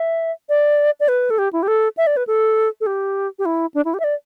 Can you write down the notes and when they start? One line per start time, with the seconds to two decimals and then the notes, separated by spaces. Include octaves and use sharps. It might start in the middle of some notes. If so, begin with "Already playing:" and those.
Already playing: E5
0.49 D5
1.00 D5
1.08 B4
1.30 A4
1.38 G4
1.53 E4
1.63 G4
1.68 A4
1.97 E5
2.07 D5
2.17 B4
2.27 A4
2.81 A4
2.86 G4
3.39 G4
3.45 E4
3.74 D4
3.85 E4
3.94 G4
4.00 E5
4.04 D5